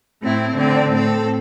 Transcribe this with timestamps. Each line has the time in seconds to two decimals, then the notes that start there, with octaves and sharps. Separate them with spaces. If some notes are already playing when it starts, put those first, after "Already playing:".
0.21 A2 A3 C4 E4
0.56 D3 C4 A4
0.91 A2 A3 C4 A4